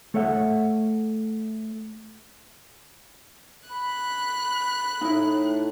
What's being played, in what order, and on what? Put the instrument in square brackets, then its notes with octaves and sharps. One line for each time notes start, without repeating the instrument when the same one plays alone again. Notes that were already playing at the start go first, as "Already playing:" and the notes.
[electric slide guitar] A3 A4 C#5 E5 F#5
[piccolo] B5 [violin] F#6
[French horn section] A2 [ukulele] D#4 E4